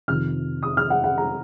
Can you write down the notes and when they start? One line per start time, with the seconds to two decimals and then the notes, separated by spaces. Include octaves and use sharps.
0.08 F2 C3 D#3 F6
0.63 D#6
0.77 F6
0.90 F#5
1.04 F#5
1.18 A#5